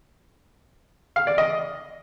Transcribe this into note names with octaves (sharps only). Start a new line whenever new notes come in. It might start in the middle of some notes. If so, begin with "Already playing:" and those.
F5
D5
D#5